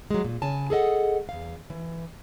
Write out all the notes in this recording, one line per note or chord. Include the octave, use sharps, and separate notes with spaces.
F#3 G#3
A#2
C#3 G#5 A5
G#4 A4 D#5 F#5
E2 F5
E3